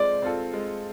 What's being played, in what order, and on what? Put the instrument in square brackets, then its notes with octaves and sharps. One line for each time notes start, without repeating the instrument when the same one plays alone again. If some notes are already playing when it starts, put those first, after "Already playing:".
Already playing: [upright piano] G#3 C4 F4 A4 [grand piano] D5
[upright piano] C4 F4 A4
G#3